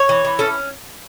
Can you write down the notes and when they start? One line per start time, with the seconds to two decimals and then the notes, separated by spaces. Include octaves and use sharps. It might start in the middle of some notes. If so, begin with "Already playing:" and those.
Already playing: C#5
0.09 E3
0.25 E3
0.39 C#4 A4